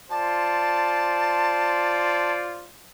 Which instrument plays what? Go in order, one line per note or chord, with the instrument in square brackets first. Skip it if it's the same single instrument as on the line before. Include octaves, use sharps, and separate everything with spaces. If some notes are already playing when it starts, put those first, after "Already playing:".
[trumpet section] F4 C5 D5 [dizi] A5